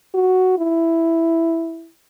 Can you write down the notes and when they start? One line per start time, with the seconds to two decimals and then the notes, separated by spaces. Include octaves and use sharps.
0.14 F#4
0.58 E4